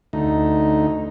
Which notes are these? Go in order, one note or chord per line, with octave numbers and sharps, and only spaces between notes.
D2 D#4